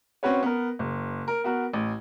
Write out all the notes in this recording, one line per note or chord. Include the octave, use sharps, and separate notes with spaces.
C4 C#4 F#4 B4 C#5
B3 A#4
F#1
A#4
B3 F#4 A#4
A1